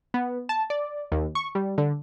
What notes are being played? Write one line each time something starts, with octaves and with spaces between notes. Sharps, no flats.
B3
A5
D5
D#2
C#6
G3
D3